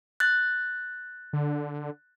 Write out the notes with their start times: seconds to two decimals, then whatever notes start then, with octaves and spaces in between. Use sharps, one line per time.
0.20 F#6 A6
1.33 D3